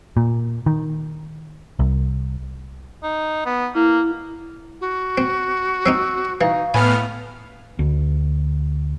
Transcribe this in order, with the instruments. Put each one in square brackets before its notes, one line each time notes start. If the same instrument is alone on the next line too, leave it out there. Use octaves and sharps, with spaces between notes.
[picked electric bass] A#2
D#3
C2
[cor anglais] D#4
B3
[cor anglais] A#3 [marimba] E4
[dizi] F#4
[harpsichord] C4
[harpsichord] F3 C4 D#4 [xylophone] E6
[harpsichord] E3 [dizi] D#4 [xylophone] F5
[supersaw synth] A2 B3 F6 [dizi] F5 [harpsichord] G#5 [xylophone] B5
[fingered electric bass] D2